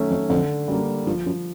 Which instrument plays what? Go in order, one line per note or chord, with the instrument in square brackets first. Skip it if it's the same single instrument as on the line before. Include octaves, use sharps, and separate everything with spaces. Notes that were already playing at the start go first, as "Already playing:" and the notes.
Already playing: [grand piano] D#3 F#3 A3 C#4
[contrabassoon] F2
[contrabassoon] F2 [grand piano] D3
[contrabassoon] F#2 [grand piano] G3 A#3
[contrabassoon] G2 [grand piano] F3
[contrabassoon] F#2